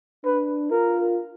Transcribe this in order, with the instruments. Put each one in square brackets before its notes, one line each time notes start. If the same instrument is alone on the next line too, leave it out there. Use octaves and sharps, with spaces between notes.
[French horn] D4 [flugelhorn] B4
[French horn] F4 [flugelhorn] A#4